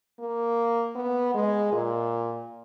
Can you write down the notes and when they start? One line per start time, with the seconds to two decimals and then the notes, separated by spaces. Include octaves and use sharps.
0.20 A#3
0.95 B3
1.34 G#3
1.72 A#2